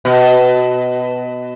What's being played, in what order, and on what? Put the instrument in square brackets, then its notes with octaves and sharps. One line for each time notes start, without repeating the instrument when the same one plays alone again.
[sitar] B2